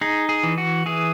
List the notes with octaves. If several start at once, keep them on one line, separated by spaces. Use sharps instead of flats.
D#4 G#4
G#4
E3
F#4
E3 G#4